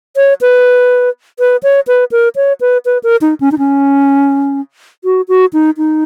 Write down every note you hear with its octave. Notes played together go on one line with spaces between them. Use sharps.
C#5
B4
B4
C#5
B4
A#4
C#5
B4
B4
A#4
D#4
C#4
D#4
C#4
F#4
F#4
D#4
D#4